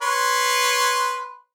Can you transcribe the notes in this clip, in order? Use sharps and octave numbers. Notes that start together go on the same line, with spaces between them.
B4 C#5 C6